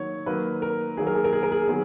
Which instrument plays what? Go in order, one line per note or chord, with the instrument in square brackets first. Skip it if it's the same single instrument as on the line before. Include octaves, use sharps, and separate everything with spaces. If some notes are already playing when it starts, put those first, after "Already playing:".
Already playing: [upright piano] D#3 F#3 A#3 C#5
D#3 F#3 A#3 B4
A#4
D#3 F#3 A#3 G#4
A#4
G#4
A#4
G#4
A#4
G#4
D#3 F#3 B3 G#4